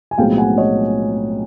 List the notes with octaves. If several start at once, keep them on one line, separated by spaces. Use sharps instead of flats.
G#5
B1 A2 F3 G#3 C4 F5 G5
F#5 G#5
C#5 D#5